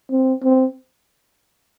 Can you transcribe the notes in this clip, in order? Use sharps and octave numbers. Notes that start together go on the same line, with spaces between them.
C4
C4